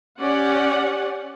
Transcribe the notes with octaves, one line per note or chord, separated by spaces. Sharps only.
C#4 G4 D5 F#5